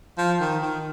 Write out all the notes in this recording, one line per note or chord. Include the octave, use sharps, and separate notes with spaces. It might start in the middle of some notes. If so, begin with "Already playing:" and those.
F3
D#3
D#3